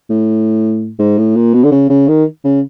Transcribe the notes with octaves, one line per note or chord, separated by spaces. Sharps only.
A2
G#2
A2
A#2
B2
D3
C#3
C#3
D#3
C#3